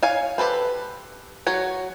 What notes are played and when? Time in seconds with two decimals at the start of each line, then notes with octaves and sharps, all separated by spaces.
0.03 C#5 F5 G#5
0.38 G4 A4 B4 C5
1.47 F#3 F#4 C#5